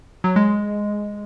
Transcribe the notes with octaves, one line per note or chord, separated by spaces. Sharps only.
F#3
G#3